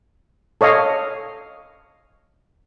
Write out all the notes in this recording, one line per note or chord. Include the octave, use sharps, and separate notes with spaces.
A4 C#5 D#5 F5